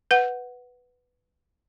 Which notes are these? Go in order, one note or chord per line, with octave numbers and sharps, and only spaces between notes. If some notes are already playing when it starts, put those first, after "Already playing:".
B4 F#5